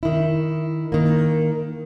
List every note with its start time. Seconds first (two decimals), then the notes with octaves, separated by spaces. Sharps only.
0.03 D#3 E4
0.92 D#3 A#3